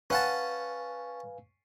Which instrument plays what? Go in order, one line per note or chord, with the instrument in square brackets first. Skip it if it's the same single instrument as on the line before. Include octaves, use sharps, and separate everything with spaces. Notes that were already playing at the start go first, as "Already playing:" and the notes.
[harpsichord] C#4 F#5 A5 [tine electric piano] B4 F5 G#5